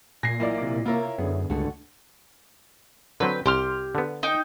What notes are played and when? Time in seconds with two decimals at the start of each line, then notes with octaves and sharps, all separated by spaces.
0.23 A#2 G#5 A#6 C7
0.40 B1 E3 A#3 F4 D5
0.58 C3 D6
0.86 A#3 E4 F4 A#4 C#5 E5
1.18 F#2 D3 B3 G#4
1.50 C#2 G2 D3 G#3 A3 F#4 F#5
3.20 D3 F#3 C4 B4 G5
3.46 C2 G4 C6 F6
3.95 D3 B3
4.23 D#4 G5